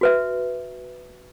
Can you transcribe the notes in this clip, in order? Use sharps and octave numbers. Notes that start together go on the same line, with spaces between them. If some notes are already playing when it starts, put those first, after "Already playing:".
F#4 B4 E5